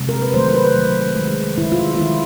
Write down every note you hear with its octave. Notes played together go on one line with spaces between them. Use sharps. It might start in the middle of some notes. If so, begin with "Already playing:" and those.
Already playing: C3 G#3
A#4
B4
D#3 F#3 A3 C5
C5
B4
D#3 F#3 A3
D#3 G#3
D#3 G#3 E4
F4
F4
D#3 G#3 E4